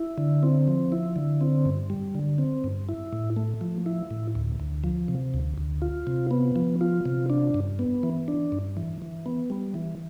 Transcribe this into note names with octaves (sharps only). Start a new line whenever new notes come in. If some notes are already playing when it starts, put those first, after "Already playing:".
Already playing: E4
D3
C4
F3
E4
D3
C4
G2
G3
D3
C4
G2
E4
A2
A3
F3
E4
A2
D2
D2
F3
C3
D2
D2
F4
C3
B3
F3
F4
C3
D4
G2
B3
E3
D4
G2
E3
E3
B3
G3
E3